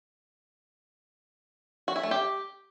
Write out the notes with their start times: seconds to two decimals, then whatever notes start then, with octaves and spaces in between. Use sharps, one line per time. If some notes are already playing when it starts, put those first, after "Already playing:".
1.88 F#4
1.96 E4
2.03 A3
2.11 G4